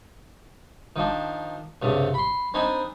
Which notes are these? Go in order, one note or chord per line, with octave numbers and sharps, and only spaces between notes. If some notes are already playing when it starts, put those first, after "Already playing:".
D#3 F3 D4
C2 G2 C#3
B5 C6
C4 D4 D#4 G#5 B5